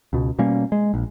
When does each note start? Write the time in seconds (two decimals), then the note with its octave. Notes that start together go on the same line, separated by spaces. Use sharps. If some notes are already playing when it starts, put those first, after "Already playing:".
0.13 C#2 B2
0.39 B2 G3 A#3 C#4
0.72 G#3
0.94 A#1